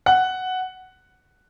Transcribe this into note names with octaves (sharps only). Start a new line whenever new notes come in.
F#5